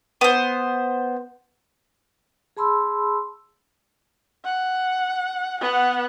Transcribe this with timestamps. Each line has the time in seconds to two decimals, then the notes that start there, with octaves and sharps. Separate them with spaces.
0.21 B3 C5
2.57 G#4 A5 B5 C6 E6
4.45 F#5
5.61 B3 F#5